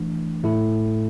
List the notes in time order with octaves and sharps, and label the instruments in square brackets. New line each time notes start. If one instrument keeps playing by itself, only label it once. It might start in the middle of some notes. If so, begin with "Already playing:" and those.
Already playing: [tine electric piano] E3 A3 D4
A2 A3 E4 A4